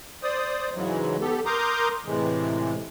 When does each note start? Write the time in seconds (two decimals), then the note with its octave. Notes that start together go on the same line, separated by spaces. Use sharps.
0.23 C5 D5 D#6
0.75 G#2 C#3 E3 F#3 G#3
1.21 B3 G4 A4
1.46 A#4 A#5 C6 D6 D#6 G6
2.05 A2 C3 E3 G#3